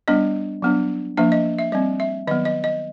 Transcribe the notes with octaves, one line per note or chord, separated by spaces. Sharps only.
G3 B3 D4 D#5
F#3 B3 D4
F3 A#3 D4 E5
D#5
E5
G3 C4 D#5
E5
D#3 F#3 B3 D#5
D#5
D#5